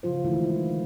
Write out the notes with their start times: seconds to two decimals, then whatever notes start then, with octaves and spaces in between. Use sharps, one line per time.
0.03 C#3 F3 F4 C5
0.25 D#3 E3 G#3 A3 E4